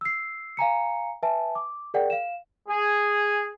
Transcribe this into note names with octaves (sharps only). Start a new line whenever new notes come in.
E6 C7
F5 G#5 A#5 C#7
B4 E5 G#5 A5
D6
G#4 A#4 D5 F#5 G5
F5 E7
G#4